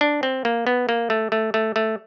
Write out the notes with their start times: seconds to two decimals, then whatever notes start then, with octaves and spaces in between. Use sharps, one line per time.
0.01 D4
0.23 C4
0.45 A#3
0.67 B3
0.89 A#3
1.10 A3
1.32 A3
1.54 A3
1.76 A3